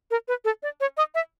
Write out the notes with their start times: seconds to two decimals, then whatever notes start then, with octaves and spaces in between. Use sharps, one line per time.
0.11 A#4
0.28 B4
0.45 A4
0.63 D5
0.80 C#5
0.97 D#5
1.15 E5